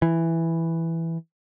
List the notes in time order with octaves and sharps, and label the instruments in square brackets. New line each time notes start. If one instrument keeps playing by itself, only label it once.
[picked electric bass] E3